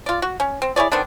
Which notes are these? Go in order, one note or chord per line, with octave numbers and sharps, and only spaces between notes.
F4 D5
F#4
C#4
C4
E4 G#4 C#5 D5
D#3 B3 C4 D4